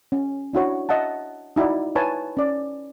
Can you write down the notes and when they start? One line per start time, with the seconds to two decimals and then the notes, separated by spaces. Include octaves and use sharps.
0.12 C#4
0.53 D4 E4 F#4 C#5
0.89 D#5 E5 F#5 A5
1.56 D#4 E4 F#4 D5
1.95 E4 B4 C#5 G#5 A5
2.37 C#4 D5